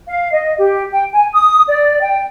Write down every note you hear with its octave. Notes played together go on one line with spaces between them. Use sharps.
F5
D#5
G4
G5
G#5
D#6
D5
G5